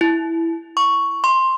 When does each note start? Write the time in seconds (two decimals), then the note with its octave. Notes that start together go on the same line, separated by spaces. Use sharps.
0.01 E4
0.77 C#6
1.24 C6